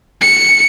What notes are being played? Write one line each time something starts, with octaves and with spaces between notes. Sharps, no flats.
C#7